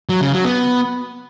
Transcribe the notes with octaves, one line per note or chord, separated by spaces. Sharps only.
F#3
C#3
F#3
B3